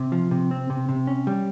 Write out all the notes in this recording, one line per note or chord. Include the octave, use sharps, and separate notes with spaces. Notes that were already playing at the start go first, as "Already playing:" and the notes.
Already playing: C3
F3
C3
C4
C3
C3
C#4
G3